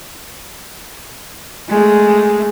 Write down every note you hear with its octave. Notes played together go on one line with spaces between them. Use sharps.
G#3 A3